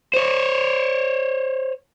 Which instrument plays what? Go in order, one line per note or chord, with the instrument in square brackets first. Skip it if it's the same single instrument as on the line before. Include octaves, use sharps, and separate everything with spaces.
[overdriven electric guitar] C5 C#5